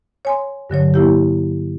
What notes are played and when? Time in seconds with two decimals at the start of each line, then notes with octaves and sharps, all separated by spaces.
0.25 C#5 G#5 C6
0.70 G2 D3 F#3 C#5
0.94 A#3 E4 G4